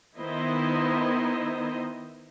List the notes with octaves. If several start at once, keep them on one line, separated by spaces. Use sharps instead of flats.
D#3 B3 E4 C5 D#5 E5